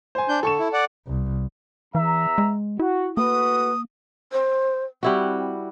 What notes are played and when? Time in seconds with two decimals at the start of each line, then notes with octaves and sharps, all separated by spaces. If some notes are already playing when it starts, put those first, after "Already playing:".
0.15 C5 G#5
0.29 D4 G6
0.43 D3 A4 C#6 E7
0.59 E4
0.73 D5 F#5
1.07 C2
1.95 E2 E3 E5 A#5
2.38 G#3
2.79 E4 F#4
3.17 A2 A#3 F#4 B4 D#6
4.32 C5
5.03 G3 C4 E4 F#4